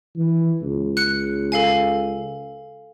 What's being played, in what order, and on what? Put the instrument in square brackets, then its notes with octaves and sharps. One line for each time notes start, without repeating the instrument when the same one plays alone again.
[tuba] E3
C#2
[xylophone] F#6 C#7
A4 F5 G#5